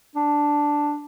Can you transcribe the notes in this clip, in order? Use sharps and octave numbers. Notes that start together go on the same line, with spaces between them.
D4